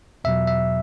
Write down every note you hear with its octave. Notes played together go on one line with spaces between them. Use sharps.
E2 B2 F#3 E5
E5